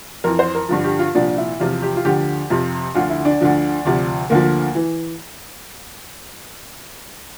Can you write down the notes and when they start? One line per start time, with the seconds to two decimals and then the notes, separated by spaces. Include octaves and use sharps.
0.24 F2 E3 A#4
0.39 C5
0.55 A#4
0.69 G2 D3 F3
0.84 G4
0.99 F4
1.14 C2 A#2 F3 D4
1.37 E4
1.59 E2 C3 F3 F4
1.82 G4
1.96 F4
2.05 D2 D3 F3 G4
2.50 F2 C3 F3
2.95 D2 D3 F3 F4
3.10 E4
3.25 D4
3.41 D2 D3 F3
3.85 D2 C3 F3
4.30 D2 D3 F3 A#3
4.75 E3